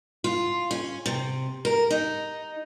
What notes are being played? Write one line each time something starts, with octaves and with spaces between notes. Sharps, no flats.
F4
C#4
C3
A#4
D#4